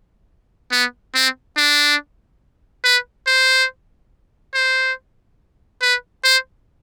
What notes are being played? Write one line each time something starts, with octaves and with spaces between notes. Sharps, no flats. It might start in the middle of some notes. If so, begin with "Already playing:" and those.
B3
C4
D4
B4
C5
C5
B4
C5